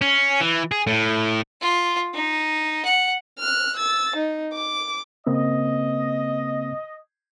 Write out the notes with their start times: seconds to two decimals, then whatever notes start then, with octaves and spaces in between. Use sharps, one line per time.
0.01 C#4
0.40 E3
0.71 G#4
0.87 A2
1.61 F4
2.14 D#4
2.85 F#5
3.39 F6 F#6
3.76 E6 A6
4.16 D#4
4.54 D6
5.27 C#3 A#3 C4 D#5